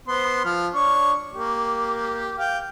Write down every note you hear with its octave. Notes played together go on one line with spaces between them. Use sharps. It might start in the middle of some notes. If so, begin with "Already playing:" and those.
B3 C5 C6
F3 F6
D4 C#5 C#6
A#3 G4
F5 G5